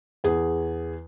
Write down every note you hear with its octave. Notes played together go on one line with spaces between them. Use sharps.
E2 G#4